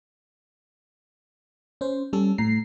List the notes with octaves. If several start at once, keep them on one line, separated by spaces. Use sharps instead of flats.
C#4 C5
G3 C#4 A4
A2 A#5 C7